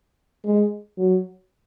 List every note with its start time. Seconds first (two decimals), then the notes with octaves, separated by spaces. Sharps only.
0.45 G#3
0.98 F#3